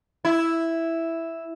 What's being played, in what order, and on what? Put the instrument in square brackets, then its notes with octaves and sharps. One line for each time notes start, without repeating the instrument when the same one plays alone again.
[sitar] E4